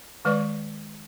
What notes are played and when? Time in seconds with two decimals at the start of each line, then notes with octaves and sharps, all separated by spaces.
0.25 D#3 G#3 B4 D5 C#6